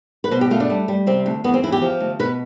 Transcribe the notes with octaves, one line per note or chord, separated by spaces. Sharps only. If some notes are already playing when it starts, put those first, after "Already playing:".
B4
B2 C5
G4
A3 F4
D4
G3
G3
C3 C4
D2
E2 B3
C4
E2 E4
G4
F3
D2
B2 B4